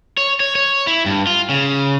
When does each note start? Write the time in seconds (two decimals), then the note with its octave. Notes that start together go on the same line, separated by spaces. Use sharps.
0.17 C#5
0.40 C#5
0.55 C#5
0.87 E4
1.06 G2
1.27 F4
1.49 C#3